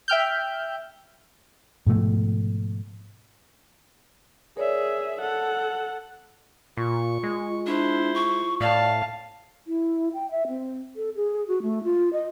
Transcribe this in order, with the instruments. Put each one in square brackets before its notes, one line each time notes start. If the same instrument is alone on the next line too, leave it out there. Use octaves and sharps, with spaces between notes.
[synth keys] E5 G5 F6 G6
[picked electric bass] G#2 B2 F3 A3
[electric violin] G#4 E5 [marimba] A#4 C#5 D5
[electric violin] A4 F#5
[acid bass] A#2 [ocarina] F4 [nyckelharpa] C#6
[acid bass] G#3
[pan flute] D4 [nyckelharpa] E4 C5
[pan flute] C#6
[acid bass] A2 [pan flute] D5 [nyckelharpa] F5 A5
[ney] E4
G5
E5
C4
A4
G#4
F#4
A3
F4
D#5